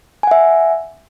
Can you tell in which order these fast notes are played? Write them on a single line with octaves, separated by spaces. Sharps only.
G#5 F#5 E5